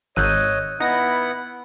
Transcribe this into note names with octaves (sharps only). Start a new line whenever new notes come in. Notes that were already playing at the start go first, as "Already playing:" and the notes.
G#1 C#5 D#5 E6 F#6 G6 D#7
B3 D#4 E4 F#5 A#6